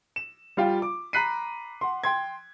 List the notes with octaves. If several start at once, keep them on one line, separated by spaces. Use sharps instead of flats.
E7
G3 F4 F5 G5
D6
A#5 B5 F#6 B6 C7 D#7
F#5 C6
G5 C6 G#6